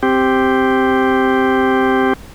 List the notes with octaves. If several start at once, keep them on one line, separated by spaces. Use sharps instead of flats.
C4 G4